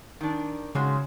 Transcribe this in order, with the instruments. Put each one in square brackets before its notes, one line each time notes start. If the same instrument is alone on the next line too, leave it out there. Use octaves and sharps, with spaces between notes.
[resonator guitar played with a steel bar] D#3 D4
[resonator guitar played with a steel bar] G#2 G#3 F#4 [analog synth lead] C#3